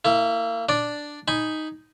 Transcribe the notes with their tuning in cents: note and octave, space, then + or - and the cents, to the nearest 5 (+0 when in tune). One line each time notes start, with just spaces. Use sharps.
A#3 -30 E4 +0
D4 +0 D5 +0 D6 +0
D#4 +0 G#5 +0 B5 +0